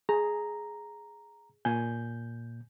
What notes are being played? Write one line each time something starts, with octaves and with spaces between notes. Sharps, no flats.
G#4 A#5
A#2 G#5 G6